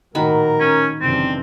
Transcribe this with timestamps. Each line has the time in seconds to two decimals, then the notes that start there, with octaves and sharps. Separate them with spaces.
0.15 A#1 A2 D#3 F#4 A#4 B5
0.60 C#4
1.01 F#1 C3 E3 C4 D4